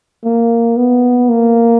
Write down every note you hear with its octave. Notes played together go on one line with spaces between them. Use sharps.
A#3
B3
A#3